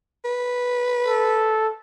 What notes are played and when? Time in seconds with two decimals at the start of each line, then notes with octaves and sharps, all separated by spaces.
0.25 B4
1.06 A4